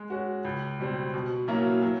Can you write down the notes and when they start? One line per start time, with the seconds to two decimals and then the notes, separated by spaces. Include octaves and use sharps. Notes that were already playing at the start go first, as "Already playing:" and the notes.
Already playing: G#3
0.10 C#4 F#4
0.45 C#2
0.79 B2 G3 C4
1.14 B2
1.48 F#3 A#3 C#4 E4
1.82 F#3